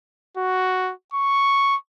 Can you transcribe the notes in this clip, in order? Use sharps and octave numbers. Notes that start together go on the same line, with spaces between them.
F#4
C#6